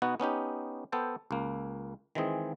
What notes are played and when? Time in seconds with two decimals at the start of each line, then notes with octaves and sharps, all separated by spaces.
0.02 B2 B3 D#4 F#4
0.20 B3 C#4 D#4 G4
0.92 B3 A4 C5 G5
1.31 C#2 A#3
2.15 D#3 E3 G#3 C4 G#4